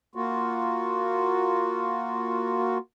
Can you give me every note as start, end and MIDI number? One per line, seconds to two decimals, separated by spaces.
0.15 2.78 58
0.15 2.78 65
0.15 2.78 66